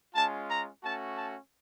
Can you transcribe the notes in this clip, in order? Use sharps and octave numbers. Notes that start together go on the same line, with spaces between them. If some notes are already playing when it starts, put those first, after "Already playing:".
G#3 C#4 F4 A5
A#5
A3 C#4 F#4 A5
A5